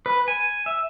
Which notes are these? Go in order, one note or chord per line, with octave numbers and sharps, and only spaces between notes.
B4
G#5
E5